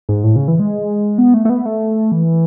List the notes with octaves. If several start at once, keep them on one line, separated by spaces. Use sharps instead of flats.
G#2
A2
C#3
E3
G#3
B3
A3
A3
B3
A3
E3